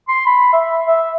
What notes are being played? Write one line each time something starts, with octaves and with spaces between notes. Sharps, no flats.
C6
B5
E5
E5